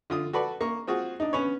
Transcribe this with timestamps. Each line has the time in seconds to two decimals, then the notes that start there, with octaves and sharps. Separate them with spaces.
0.10 D3 F4 D#6
0.33 F#4 A4 B4 D5
0.61 A#3 C#6
0.87 C4 F4 F#4 G#4
1.20 D4 D#4
1.33 B3 C#4 B4 C#5